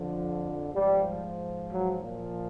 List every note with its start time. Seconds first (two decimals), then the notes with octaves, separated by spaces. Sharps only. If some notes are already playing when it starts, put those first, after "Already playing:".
Already playing: F2 D3 F3
0.74 G#2 F3 G3
1.71 F#3
2.02 A#2 F3